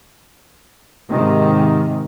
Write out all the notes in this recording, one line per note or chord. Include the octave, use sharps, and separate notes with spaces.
G#2 C3 D#3